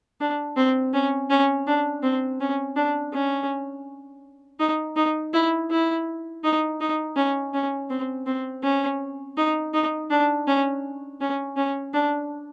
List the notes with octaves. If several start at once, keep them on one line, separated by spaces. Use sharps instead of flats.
D4
C4
C#4
C#4
D4
C4
C#4
D4
C#4
D#4
D#4
E4
E4
D#4
D#4
C#4
C#4
C4
C4
C#4
D#4
D#4
D4
C#4
C#4
C#4
D4